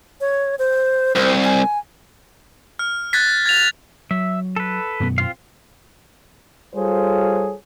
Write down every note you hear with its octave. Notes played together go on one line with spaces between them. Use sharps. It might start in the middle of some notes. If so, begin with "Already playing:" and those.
C#5
C5
C2 C5
G#5
F6
F#6 G#6 A6 B6
G#6 A6 F7
F#3 E5
A4 B4
F#2 B2 B3
C4 F4 F5
G3 F4 G#4 A4 C5 C#5